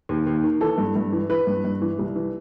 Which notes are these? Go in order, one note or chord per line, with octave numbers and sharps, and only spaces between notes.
D#2
D#2
D#3
E3 A4
G2
G2
E3
E3 B4
G2
G2
E3
C2
E3